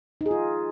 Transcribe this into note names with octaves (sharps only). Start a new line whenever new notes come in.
D#4
G#4
F4